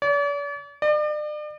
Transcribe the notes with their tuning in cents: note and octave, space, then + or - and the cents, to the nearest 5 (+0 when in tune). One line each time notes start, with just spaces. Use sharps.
D5 -45
D5 +40